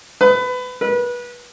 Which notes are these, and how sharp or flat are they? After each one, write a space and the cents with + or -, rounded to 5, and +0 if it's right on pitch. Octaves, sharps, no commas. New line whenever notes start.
B4 +25
B4 -25